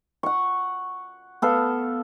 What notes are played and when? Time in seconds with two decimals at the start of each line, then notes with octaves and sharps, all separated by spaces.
0.23 F#5 C#6
1.42 B3 A4 F5